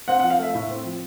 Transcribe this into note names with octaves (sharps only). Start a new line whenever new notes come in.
C4 F#5
F#5
F3
F5
A3 E5
A2 E5
C4
F3